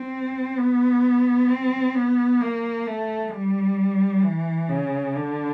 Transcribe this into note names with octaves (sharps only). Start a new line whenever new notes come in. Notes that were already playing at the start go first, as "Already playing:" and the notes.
Already playing: C4
B3
C4
B3
A#3
A3
G3
E3
C#3
D3